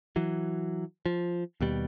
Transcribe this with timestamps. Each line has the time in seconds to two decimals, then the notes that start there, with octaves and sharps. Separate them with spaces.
0.16 E3 F#3
1.06 F3
1.60 D#2 B2 G3